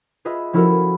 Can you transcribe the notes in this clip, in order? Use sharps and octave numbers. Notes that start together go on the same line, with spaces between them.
F4 G#4 B4 D#5 E5
F3 C#4 E4 F#4 A4 A#4
A4